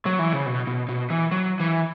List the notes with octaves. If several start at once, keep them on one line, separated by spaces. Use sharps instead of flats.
F#3
E3
C#3
B2
B2
B2
E3
F#3
E3